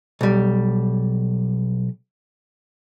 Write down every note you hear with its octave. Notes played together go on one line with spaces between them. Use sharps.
B1 G3